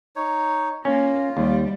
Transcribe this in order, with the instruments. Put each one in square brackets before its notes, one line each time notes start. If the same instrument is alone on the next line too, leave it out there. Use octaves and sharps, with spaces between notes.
[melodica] D#4 C#5
[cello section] A#3 [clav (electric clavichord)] C#4 [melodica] F4
[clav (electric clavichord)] D#2 [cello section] G3